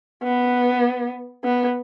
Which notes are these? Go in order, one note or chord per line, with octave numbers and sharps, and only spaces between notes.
B3
B3